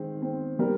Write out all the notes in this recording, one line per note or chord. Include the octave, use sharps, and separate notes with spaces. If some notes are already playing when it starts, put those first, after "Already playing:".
Already playing: D#3 G#3 C4
C4
G3 A#4